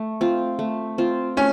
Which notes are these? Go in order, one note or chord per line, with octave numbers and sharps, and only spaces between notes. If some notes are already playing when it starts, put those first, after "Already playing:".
Already playing: A3
C4 F4
A3
C4 F4
A3 C#4